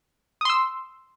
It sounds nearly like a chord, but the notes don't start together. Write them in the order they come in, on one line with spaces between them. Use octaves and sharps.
D#6 C6 E6